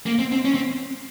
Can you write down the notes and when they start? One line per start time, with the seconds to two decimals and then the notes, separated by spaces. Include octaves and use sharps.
0.06 A#3
0.19 C4
0.32 C4
0.45 C#4
0.54 C4